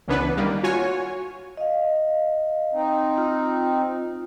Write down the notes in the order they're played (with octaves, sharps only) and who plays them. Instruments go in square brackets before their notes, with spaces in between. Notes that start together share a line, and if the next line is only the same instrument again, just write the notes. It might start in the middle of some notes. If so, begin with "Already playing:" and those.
[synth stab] C#2 C#3 E3 B3 D4 B4
D#3 G3 A#3
F4 F#4 C#5 G#5
[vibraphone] D#5 F5
[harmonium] C4 D#4
[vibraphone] F4